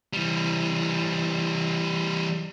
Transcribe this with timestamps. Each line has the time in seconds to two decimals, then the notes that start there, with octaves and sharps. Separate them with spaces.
0.13 E3 G3